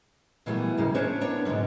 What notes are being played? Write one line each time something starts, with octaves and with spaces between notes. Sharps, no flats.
A#2 E3 F#3 G3 A3 B3
D#2 C#3 A#3
C#4 D4 C5 C#5
A#3 B3 D4 C#5
G#2 B2 D3 G#3 C#4